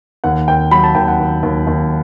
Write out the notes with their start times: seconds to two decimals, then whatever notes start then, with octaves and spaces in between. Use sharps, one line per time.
0.24 D#2 F#5
0.48 D#2 G5
0.71 F#3 B5
0.84 A5
0.95 D#2 G5
1.08 F#5
1.20 D#2
1.43 D#2
1.67 D#2